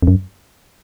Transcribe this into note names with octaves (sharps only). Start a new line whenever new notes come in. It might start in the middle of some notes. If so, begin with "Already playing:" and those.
F2
F#2